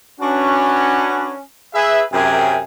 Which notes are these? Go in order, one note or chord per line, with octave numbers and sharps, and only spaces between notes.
C#4 D4 F#4 B4
G#4 B4 E5
F#2 C3 G#4 A#4 E5 G5